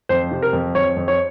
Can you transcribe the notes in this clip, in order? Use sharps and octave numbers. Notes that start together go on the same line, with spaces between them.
F2 C5
C3
A#4
F2
F2 C#5
F2
C#5